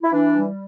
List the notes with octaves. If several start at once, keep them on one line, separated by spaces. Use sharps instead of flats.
E4
E3 D4
G3